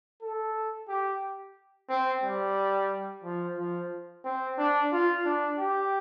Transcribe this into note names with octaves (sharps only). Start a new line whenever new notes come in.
A4
G4
C4
G3
F3
F3
C4
D4
F4
D4
G4